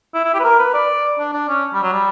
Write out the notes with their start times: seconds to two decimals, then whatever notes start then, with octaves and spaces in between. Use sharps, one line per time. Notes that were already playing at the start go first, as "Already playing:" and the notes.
0.14 E4
0.24 E4
0.34 G4
0.40 B4
0.44 A#4
0.59 B4
0.74 D5
1.19 D4
1.33 D4
1.49 C#4
1.74 G3
1.83 F#3
1.93 G3